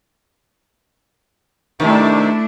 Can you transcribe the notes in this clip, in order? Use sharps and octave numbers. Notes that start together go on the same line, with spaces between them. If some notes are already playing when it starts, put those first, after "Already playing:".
C3 D#3 A3 D4 E4